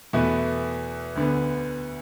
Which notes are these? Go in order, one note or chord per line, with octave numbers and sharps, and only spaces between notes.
E2 B2 A3 E4 B4
D2 D3 B3